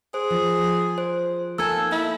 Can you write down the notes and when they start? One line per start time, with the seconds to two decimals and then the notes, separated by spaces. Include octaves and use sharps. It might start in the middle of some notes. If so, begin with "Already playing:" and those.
0.14 G#4 C5
0.30 F3
0.98 C5
1.58 A#3 D#4 A4 G#5 E6 G#6
1.92 E4